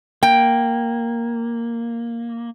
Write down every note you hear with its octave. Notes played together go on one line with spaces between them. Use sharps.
A#3 G5